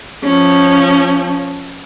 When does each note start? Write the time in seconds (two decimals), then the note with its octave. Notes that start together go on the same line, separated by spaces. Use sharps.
0.24 F3 C#4